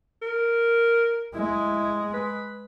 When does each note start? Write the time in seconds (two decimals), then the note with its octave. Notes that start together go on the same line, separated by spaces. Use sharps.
0.22 A#4
1.35 G#3 E4
2.14 B4